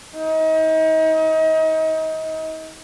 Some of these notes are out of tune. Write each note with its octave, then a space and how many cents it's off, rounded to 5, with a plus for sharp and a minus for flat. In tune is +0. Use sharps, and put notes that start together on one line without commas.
D#4 +35